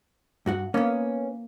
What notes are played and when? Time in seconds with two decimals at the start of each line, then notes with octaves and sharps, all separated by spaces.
0.46 G2 F#4 F#5
0.74 A#3 B3 C#4